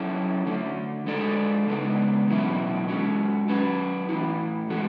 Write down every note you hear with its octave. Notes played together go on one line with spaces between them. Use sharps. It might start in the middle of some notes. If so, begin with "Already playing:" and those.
Already playing: F#3 C#4 E4 A4
D3 A3 D4
G#3 D4 A4 D5
C#3 G#3 B3 D4
E2 B2 F#3 C#4 E4
G#3 C#4 F#4
F#3 C#4 F#4 B4
A2 E3 B3 E4
G#3 B3 F#4 A4